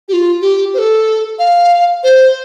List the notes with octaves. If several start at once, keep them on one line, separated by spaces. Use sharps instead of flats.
G4
F4
G4
C5
A4
F5
C5